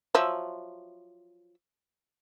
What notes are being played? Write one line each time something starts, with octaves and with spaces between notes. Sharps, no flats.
F3 F#3 E5